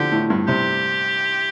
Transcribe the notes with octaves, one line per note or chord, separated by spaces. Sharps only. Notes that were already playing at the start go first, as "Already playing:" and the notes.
Already playing: D3 F3 G4
A2
G2
C3 G4